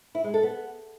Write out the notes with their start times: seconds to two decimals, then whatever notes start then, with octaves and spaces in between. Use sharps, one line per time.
0.15 E4
0.24 G#3
0.34 A4
0.43 B3